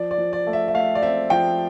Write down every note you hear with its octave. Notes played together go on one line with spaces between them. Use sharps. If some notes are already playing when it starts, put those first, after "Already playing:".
Already playing: F3 D5
D5
F3
D5
A3
E5
E5
A3 F5
D5
C4 E5
F3 G5